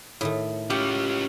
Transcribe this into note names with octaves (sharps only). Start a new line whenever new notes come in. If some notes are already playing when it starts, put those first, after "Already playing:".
A2 D#3 A3
C#4 F4 G4